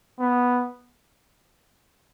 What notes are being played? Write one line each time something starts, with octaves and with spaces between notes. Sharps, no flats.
B3